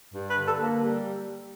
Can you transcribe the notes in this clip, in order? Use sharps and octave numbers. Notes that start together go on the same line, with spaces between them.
G2
B4
D3
A4
A#3
G3